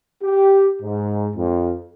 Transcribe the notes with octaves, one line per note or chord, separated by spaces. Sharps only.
G4
G#2
F2